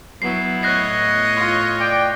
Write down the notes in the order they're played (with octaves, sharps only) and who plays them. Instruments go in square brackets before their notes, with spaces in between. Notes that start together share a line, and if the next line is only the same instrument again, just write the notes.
[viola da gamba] F#3 [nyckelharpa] B3 E4 [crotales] C7
[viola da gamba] A2 C#5 D#5 [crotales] F#6 A#6 C7
[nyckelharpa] F4
[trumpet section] D5 G5